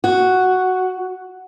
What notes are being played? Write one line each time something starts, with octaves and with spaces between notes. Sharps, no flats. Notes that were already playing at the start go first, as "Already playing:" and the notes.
F#4